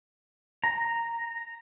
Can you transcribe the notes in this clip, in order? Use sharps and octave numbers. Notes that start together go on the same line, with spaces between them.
A#5